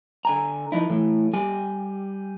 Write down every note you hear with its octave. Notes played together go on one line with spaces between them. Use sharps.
D3 G#5 A#5
F3 D#4 E4
A2 E3
G3 G4 G#5